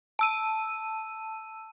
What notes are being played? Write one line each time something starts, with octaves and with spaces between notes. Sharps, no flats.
A5 E6 D#7